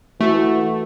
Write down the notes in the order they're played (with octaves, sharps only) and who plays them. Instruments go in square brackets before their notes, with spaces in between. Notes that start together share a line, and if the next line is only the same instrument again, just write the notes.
[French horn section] E3 F#4 [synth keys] A3